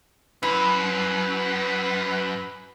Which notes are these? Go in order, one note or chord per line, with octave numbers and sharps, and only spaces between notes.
F#2 E4 B4